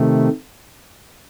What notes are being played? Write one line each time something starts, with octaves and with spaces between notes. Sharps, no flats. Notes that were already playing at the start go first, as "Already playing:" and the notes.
Already playing: C3 D#3 A3